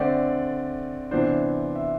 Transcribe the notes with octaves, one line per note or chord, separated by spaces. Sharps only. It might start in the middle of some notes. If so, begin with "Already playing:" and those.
Already playing: D3 A3 C4 D5
C3 E3 B3 D4 C5
E5